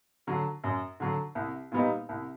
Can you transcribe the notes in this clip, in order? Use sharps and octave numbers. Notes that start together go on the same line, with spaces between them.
D3 F#3
F#2
D3 F#3
C2
A#2 G3 B3 D#4
C2